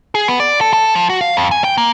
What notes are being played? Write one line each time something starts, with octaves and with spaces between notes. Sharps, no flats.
G#4
B3
D5
A4
A4
F3
F#4
F5
F2
G#5
G5
A#3